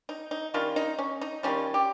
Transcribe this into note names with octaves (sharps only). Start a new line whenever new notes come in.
D#4
D#4
D#3 G3 C#4 F4
D#4
C#4
D#4
D#3 G3 C#4 F4
G4